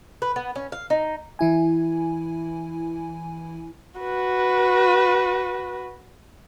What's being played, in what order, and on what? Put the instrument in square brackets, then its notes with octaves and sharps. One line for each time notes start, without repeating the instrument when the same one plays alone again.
[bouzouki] B4
B3
C#4
F5
D#4
[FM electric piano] E3 E4 G#5
[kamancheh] F#4 B4